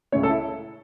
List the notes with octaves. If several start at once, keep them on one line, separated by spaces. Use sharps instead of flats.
C#2 C#3 A3 C#4 C#5
A4
E4